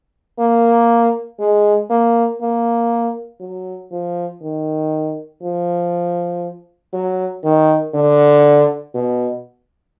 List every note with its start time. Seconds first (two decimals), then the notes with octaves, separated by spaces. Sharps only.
0.39 A#3
1.39 G#3
1.90 A#3
2.41 A#3
3.41 F#3
3.91 F3
4.42 D#3
5.43 F3
6.94 F#3
7.44 D#3
7.94 D3
8.95 B2